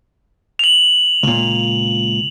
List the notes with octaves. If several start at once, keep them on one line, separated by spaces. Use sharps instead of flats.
F7 F#7
C#2 A#2